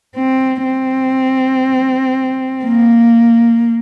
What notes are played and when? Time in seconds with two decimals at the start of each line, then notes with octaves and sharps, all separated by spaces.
0.16 C4
0.64 C4
2.64 A#3